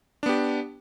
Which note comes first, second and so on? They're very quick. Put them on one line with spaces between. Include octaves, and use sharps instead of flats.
D4 B3 G4